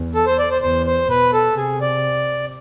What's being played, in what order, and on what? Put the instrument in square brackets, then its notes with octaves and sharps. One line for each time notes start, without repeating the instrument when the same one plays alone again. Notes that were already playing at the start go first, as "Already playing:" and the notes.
Already playing: [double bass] E2
[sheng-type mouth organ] A4
C5
D5
C5
[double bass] E2 [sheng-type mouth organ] C5
[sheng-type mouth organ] C5
[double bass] B2 [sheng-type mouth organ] B4
[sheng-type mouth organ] A4
[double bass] C3 [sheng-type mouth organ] G#4
[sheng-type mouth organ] D5